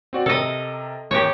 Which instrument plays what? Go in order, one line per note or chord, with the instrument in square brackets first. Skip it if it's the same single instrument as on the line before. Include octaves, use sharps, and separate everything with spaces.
[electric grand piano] C4 F#4 D5
[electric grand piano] C3 A#4 [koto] A4 D#5
[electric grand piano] E2 [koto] G4 C#5